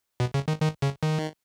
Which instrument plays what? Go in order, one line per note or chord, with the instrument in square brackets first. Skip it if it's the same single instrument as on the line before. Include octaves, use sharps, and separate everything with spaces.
[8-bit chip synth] B2
C#3
D#3
D#3
C#3
D#3